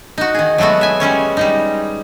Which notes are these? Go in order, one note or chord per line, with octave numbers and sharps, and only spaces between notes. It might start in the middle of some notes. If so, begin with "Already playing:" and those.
D#4 F#4
D#3 G#4
F#3 G#3 A3 B3 F#4
E5 G#5
G3 G#3 C#4 C#5
G3 G#3 D#4